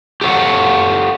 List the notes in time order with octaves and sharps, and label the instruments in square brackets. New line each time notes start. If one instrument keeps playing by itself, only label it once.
[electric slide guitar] G4 A4 C#5 F#5